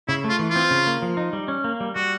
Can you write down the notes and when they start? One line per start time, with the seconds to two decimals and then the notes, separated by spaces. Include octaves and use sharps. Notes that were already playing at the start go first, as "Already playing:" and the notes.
0.08 C#3 E4
0.24 A3
0.30 F4
0.39 E3
0.50 F4
0.56 C4
0.71 C#3
0.87 A#3
1.02 F3
1.17 D#4
1.33 G3
1.48 C#4
1.64 A#3
1.80 G3
1.95 G3 F#4